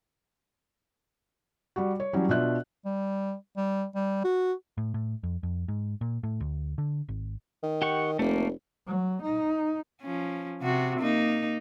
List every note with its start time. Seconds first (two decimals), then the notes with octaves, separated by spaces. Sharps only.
1.76 G3 F#4
2.00 C#5
2.13 E3 F#3 G3 C#4 G4
2.29 B2 D4 F4 E5 F#6
2.85 G3
3.57 G3
3.95 G3
4.24 F#4
4.78 A2
4.94 A2
5.23 F2
5.43 F2
5.68 G#2
6.01 A#2
6.23 A2
6.40 D2
6.78 D3
7.09 G#1
7.63 D#3
7.82 G4 F#5 C#6
8.19 F1 A3 A#3
8.87 F#3
9.22 D#4
10.02 F3 C#4
10.62 C3 F#4
10.99 A#3 D#4